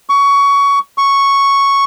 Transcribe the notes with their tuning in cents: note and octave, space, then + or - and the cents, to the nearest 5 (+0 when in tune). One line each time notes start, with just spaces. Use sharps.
C#6 +20
C#6 +0